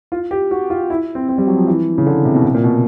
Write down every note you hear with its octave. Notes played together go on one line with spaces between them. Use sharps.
F4
G4
F#4
F4
E4
C4
C4
G3
F#3
F3
E3
C#3
D3
C3
B2
C3
A#2
B2